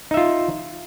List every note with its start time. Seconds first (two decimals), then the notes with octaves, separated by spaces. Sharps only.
0.11 D#4
0.14 E5
0.17 F4